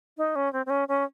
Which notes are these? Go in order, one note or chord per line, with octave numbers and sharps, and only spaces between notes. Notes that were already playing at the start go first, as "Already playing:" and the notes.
D#4
C#4
C4
C4
C#4
C#4